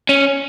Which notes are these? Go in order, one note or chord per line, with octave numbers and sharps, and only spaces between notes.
C#4